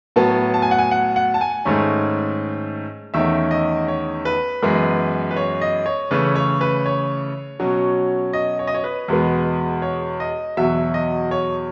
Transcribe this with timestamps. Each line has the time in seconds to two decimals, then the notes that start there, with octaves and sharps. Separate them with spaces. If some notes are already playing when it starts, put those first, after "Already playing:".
0.16 A2 F#3 B3 A5
0.54 A5
0.62 G#5
0.71 F#5
0.78 G#5
0.91 F#5
1.16 F#5
1.34 A5
1.41 G#5
1.65 G#2 D#3 A3 C#4
3.14 E2 D#3 A3 C#4 E5
3.51 D#5
3.88 C#5
4.25 B4
4.62 F#2 E3 G#3 B3
5.31 B4
5.36 C#5
5.61 D#5
5.86 C#5
6.11 C#3 E3 A3 C#4 B4
6.35 C#5
6.61 B4
6.86 C#5
7.60 B2 F#3 C#4
8.33 D#5
8.59 C#5
8.67 D#5
8.74 C#5
8.84 B4
9.08 E2 B2 G#3 B3
9.82 C#5
10.20 D#5
10.57 E2 B2 F#3 E5
10.94 D#5
11.31 C#5